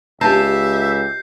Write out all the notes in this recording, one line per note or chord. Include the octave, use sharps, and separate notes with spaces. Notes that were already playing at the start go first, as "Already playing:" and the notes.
C#2 G4 E5 G#5 A5 G6 A#6 C7